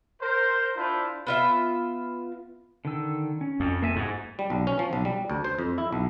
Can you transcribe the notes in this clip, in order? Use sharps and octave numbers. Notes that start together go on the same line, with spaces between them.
A#4 C5
D4 E4 F4 C5
B3 F4 E5
D3 D#3 E6
C#4
F2
A#3 E5 G#5
G#2 F#4
G3
B1
C#4
F3
B1
G3
D2
C5
F2
E4
B1